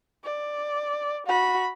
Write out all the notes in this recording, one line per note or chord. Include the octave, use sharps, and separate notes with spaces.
D5
F#4 B5